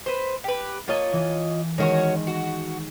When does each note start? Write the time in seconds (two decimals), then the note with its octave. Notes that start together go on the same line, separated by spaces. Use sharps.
0.06 B4 C5
0.44 G4 B4
0.88 A#3 F4 C#5 D#5 A5
1.13 E3
1.78 D#3 G#3 C#4 F#4 A#4 C#5
2.27 F#4